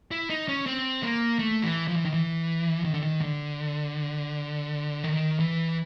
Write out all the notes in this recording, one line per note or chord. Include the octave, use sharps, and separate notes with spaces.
E4
D#4
C#4
C4
A#3
A3
E3
F3
E3
D#3
E3
D#3
D3
D#3
D3
D#3
E3